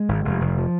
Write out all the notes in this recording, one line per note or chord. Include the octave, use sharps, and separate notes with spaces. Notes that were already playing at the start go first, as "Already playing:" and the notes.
Already playing: G#3
G#1
F1
F1
F3